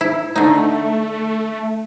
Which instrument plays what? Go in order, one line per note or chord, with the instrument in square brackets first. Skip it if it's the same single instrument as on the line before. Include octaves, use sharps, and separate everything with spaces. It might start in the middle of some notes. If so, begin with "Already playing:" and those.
[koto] E4
[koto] D3 D#4 [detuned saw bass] A3